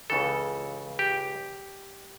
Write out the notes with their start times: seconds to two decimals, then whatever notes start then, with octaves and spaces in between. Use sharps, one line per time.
0.10 C#2 C#3 E3 A4
0.99 G4